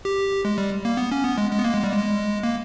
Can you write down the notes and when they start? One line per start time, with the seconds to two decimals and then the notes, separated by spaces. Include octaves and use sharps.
0.05 G4
0.45 G#3
0.58 G3
0.85 A#3
0.97 B3
1.12 C#4
1.24 B3
1.38 G#3
1.51 G#3
1.59 B3
1.65 A#3
1.74 G#3
1.84 G3
1.94 G#3
2.43 A#3